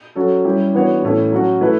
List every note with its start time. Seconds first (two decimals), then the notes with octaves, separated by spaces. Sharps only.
0.15 F#3 C#4 F#4 A4
0.44 G3 C#4 E4 G4
0.75 E3 B3 D4 F#4 C#5
1.02 A2 E3 A3 C#4 E4
1.32 F#3 C#4 F#4
1.60 E3 A3 E4 B4